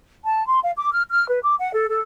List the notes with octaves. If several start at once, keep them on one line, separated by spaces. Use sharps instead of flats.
A5
C6
F5
D6
F6
F6
B4
D6
F#5
A4
A4